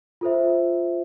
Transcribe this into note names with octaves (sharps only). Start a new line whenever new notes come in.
F4 A4 C5 E5